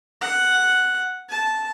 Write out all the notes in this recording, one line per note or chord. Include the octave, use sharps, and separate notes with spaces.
F#5
A5